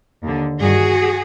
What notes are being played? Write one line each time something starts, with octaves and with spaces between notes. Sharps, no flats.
D#2 D3
G2 D#3 F#4 G#4